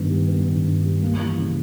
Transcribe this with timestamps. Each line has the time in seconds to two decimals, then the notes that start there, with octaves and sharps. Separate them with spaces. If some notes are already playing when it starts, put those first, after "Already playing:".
Already playing: G2 D#3 B3
0.10 G3
0.28 B3
0.47 D#3
0.65 G2
0.84 G3
1.02 A#3
1.20 E3
1.38 C#3